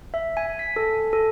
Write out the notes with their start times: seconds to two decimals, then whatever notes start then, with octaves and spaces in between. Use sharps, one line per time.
0.14 E5
0.37 G#5
0.59 B6
0.76 A4
1.13 A4